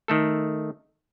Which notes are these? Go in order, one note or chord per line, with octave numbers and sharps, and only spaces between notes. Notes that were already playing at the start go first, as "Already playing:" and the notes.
D#3 A3 A4